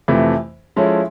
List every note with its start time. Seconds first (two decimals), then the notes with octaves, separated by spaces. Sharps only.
0.08 F2 C3 E3 A3
0.76 F3 G#3 C#4 E4 A4